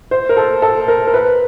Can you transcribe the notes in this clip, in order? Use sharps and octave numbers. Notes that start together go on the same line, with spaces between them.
C5
A#4
A4
A4
A#4
A#4
B4